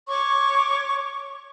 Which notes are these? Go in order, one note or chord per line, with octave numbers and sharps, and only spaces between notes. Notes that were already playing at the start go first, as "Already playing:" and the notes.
C#5 C#6 D6